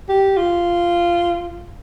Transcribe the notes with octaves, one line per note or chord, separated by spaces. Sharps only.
G4
F4